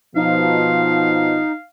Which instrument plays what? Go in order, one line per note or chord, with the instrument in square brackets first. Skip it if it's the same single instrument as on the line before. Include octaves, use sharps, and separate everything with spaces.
[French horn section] B2 F3 [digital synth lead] D#4 [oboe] F5